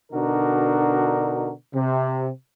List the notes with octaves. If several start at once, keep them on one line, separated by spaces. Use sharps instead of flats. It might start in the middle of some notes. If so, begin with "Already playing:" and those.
B2 D3 D4 D#4 F#4 A#4
C3